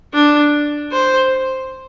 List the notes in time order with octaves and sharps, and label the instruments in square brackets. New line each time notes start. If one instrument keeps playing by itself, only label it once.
[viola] D4
C5